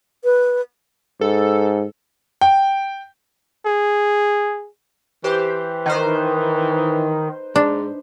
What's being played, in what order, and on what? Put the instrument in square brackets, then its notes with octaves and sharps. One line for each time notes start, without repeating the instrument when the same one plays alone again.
[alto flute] B4
[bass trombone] G#2 [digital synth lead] A4
[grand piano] G5
[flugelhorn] G#4
[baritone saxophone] E3 [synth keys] G4 C5
[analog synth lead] D#3 [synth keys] D#4 B4 C5
[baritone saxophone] G#2 [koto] D4